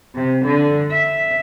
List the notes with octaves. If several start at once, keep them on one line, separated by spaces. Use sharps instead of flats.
C3
D3
E5